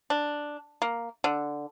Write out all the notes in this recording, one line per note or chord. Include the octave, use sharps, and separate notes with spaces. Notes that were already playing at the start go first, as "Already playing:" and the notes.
D4
A#3
D3